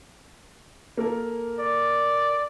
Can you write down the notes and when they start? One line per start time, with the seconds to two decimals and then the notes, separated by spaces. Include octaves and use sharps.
0.97 A#3 A4 A#4
1.60 D5